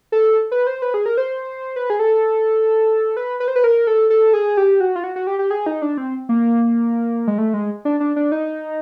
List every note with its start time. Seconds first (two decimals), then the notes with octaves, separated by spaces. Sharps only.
0.12 A4
0.52 B4
0.67 C5
0.82 B4
0.94 G#4
1.06 A#4
1.17 C5
1.76 B4
1.90 G#4
2.00 A4
3.17 B4
3.40 B4
3.48 C5
3.56 B4
3.64 A#4
3.87 A4
4.10 A4
4.33 G#4
4.57 G4
4.80 F#4
4.96 F4
5.04 F#4
5.16 F#4
5.27 G4
5.39 G4
5.51 G#4
5.66 D#4
5.82 D4
5.98 C4
6.29 A#3
7.27 G#3
7.38 A3
7.54 G#3
7.85 D4
8.00 D4
8.16 D4
8.32 D#4